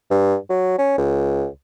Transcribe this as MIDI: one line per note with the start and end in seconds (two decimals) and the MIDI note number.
0.11 0.36 43
0.49 0.74 54
0.78 0.97 61
0.98 1.46 37